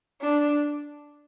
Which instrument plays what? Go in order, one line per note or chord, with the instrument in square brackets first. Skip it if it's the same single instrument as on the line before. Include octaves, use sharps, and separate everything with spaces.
[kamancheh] D4